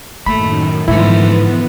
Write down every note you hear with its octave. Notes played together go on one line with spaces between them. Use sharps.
F#2 A2 D#3 A3 A#3 B5
G#2 D3 E3 F3 B3 E4